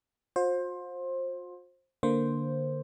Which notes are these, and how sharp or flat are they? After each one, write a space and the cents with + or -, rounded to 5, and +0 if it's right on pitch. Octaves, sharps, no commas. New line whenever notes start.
F4 +45 C5 +20
D3 +0 A#3 +0 C5 +0